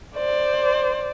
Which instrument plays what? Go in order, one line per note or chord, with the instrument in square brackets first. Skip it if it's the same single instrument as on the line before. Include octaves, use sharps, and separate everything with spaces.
[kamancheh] C5 D5